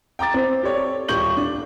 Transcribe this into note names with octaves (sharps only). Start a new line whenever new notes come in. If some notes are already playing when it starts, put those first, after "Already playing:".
G5 A#5 D6 A6
C4
G4 A4 C#5 D5
D#1 G4 C#6 G6 F#7
D4